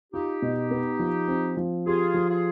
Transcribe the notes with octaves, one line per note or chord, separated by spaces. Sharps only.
D#4 F4 G4
B2
B3
F3
C4
F3
F4 G4 G#4
F3
F4 G#4